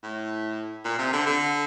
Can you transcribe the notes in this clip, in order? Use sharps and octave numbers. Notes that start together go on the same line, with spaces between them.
A2
A#2
C3
D3
D3